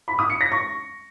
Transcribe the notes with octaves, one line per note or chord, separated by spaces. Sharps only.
B5
D#6
C#7
A#6
C#6